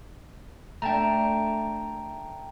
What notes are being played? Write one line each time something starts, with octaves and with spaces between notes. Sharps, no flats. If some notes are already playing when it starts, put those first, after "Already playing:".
A3 D4 G5 A5 A#5